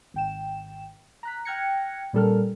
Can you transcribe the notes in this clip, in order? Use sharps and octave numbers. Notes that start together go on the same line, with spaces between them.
G#1 G5 E7
A#5 F#6 B6
G5 F6 F#6 G#6 A#6 C#7
A#2 G3 C#4 A4 A#4 F6